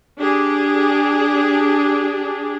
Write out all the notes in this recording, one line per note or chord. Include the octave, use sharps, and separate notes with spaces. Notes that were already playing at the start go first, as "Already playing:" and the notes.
D4 G4 G#4